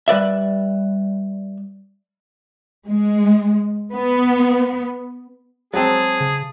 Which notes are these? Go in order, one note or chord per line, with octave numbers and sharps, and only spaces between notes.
G3 B4 D5 E5
G#3
B3
F#3 G#3 C4 G#4 A5
C#3